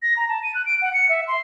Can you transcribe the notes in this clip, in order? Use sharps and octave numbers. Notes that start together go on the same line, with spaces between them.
A#6
A#5
A5
D#7
F#6
D7
F#5
C#7
E5
C6